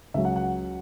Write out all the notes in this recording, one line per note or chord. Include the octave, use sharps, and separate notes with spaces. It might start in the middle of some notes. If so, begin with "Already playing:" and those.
C#2 C#3 F#3 E5
F#5
F#5